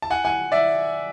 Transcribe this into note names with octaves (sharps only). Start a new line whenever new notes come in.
A5
F#5 G#5
F#5 G#5
D5 E5